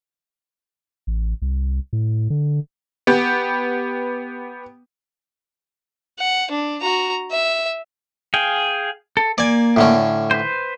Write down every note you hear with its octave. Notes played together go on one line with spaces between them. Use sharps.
A1
C2
A2
D3
B3 G4
F#5
D4
F#4 A#5
E5
G#4 F5 G5
A4
A#3 D5 G#5
A2 D3 C#4
B4 C5